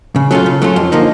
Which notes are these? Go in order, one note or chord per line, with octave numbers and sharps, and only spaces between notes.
C#3
F#3 A3 C#4 F4
C#3
F#3 A3 C#4 F4
F2
D3 F3 A#3 D#4